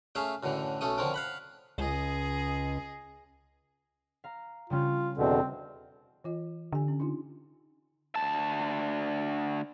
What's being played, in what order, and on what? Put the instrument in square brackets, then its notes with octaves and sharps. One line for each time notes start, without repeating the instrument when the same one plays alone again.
[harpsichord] A3 C#4 G#4 E5 F5
F#2 A2 D3 E3
B1 A3 C#4 A4 D#6
D3 F3 C4 C#4 A#4
F5 F#5 B5
[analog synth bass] C#2 [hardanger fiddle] G#4 D#5
[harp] F5 A#5
[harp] C#3 G3 C#4 [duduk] F4
[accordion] E2 B2 D3 [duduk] C4
[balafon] E3 F4 D#5
[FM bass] D3 [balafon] G4 G#5
[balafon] C#4
D4 D#4 F4
[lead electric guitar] D2 A5